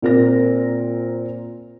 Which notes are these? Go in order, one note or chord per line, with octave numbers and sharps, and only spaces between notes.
A#2 C4 A#4 C5 A#6